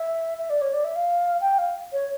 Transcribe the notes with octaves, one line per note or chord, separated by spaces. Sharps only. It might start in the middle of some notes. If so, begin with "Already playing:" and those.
Already playing: E5
E5
D5
C#5
D5
E5
F5
G5
F5
C#5